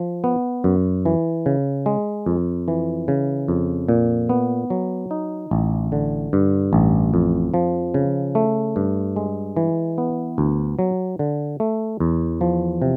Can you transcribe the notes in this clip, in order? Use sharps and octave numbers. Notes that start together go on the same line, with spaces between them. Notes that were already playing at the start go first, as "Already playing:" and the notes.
Already playing: F3
B3
F#2
E3
C#3
G#3
F2
E3
C#3
F2
A#2
B3
F#3
D#4
A1
D3
G2
A1
F2
F3
C#3
A3
G2
G#3
E3
B3
D2
F#3
D3
A3
E2
F3
C3